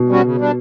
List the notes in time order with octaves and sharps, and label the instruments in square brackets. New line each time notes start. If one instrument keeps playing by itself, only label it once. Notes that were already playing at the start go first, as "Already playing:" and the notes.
Already playing: [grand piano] B2
[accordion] G3 C#4 F#4
C#3
G3 D4